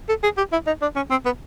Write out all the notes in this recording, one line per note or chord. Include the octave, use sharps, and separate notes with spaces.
A4
G#4
G4
E4
D#4
D4
C#4
C4
B3